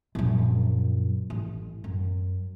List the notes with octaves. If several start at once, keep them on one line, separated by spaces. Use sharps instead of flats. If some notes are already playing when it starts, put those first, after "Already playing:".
A#1 F#2
A1
F#2